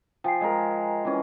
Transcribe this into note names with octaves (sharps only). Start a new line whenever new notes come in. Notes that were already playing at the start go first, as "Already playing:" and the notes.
F3 G5 G#5 C7
G#3 A#4
E3 C#4